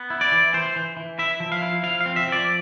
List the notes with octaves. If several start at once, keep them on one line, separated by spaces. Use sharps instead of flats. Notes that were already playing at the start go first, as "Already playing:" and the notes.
Already playing: B3
E4
D5
E3
E3 C5
E3
E3
E4 E5
F3
F5
E4
F3 F5
F5
C4
E5
F3
D5